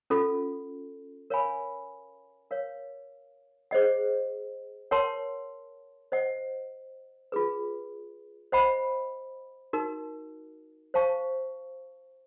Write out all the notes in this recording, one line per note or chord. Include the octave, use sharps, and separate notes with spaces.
C#4 F4 A4
A#4 C#5 F5 G#5 B5
A#4 C#5 F5
G#4 C5 D#5 F#5
A#4 C#5 F#5 A5 C6
C5 D#5 F#5
F4 G#4 B4
C5 D#5 F#5 B5
D#4 F#4 A#4
C5 F5 A5 C#6